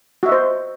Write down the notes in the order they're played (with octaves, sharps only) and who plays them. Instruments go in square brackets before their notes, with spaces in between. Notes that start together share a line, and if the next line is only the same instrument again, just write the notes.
[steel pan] F#4
E5
D#5
C5